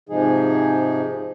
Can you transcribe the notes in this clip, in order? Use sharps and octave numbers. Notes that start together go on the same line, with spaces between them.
G#2 C3 F3 G#3 D#4 G#4